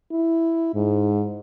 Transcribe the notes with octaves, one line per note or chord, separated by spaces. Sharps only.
E4
G#2